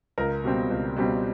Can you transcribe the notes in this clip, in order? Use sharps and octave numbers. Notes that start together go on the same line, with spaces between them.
C#2 A#4
B2 G3 C4
C#2
B2 G3 C4